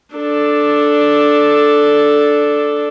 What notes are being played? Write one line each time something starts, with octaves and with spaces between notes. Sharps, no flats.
D4 A4